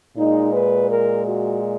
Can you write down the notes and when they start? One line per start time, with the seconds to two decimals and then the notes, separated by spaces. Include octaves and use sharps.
0.17 A#2 G#3 D#4
0.53 B4
0.90 A#4
1.27 F#4